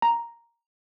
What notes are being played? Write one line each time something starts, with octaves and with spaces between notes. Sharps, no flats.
A#5